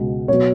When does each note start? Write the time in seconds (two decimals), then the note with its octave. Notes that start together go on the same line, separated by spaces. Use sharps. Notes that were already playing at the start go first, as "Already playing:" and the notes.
Already playing: C#2 B2 G#3
0.28 B2 F#3 B3 C#5